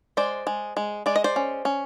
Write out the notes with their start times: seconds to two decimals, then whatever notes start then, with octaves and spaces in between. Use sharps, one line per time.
0.17 G#3 C5 D5
0.47 G#3
0.77 G#3
1.06 G#3 D5
1.16 D#5
1.24 C5 D5
1.36 C#4
1.65 C#4